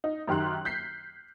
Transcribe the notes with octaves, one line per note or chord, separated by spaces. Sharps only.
D#4
F#2 D#3 G4 C6 F#6
G6 B6 C7